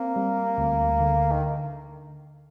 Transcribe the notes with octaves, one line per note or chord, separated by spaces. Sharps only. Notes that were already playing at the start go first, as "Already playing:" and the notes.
Already playing: A#3 C4
G3
D2
D3
D#3